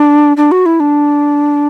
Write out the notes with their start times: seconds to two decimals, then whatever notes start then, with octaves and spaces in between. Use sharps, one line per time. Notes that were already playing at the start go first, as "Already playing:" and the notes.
Already playing: D4
0.37 D4
0.51 F#4
0.66 E4
0.80 D4